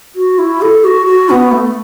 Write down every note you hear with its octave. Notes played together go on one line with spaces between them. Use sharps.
F#4
E4
A4
F#4
F#4
B3
A3